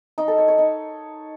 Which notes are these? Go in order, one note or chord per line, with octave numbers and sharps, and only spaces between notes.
D#4
A4
C#5
C#5
D#4